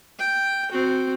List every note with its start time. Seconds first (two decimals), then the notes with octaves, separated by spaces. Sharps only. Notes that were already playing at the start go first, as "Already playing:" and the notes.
0.19 G5
0.71 C4 F#4